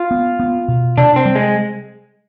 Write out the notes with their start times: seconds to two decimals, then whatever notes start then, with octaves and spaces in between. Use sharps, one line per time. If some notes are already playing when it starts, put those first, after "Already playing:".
Already playing: F4
0.11 B3
0.40 B3
0.68 B2
0.98 C3 D4
1.16 C4
1.25 G3
1.35 G#3